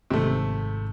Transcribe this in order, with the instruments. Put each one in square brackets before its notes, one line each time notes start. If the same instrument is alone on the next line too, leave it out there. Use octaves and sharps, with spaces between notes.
[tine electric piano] G#1 G#2 [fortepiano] C3 A3